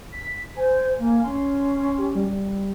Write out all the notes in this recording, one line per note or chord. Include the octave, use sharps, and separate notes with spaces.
B6
C5 G#5
A#3
C#4 C6
G4
G3